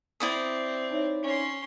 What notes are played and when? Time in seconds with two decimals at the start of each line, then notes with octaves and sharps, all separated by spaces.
0.20 C4 E4 D5 D#6
0.91 D#4 C#5 E5
1.23 C#4 C6